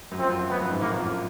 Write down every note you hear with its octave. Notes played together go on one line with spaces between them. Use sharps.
F#2
F2 C4
F#2
F#2
F2 B3
F#2
G#2
A2 A#3
F2
F#2